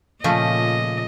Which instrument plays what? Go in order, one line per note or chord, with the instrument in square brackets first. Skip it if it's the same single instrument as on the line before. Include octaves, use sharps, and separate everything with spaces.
[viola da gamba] A#2 D#5 [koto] C#3 F3 A3